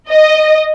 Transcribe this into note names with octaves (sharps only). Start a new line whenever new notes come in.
D#5